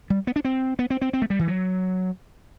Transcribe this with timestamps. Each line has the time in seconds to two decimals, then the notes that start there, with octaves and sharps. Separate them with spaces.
0.10 G3
0.27 B3
0.36 D4
0.45 C4
0.79 B3
0.90 C4
1.01 C4
1.13 C4
1.22 A3
1.30 G3
1.39 E3
1.48 F#3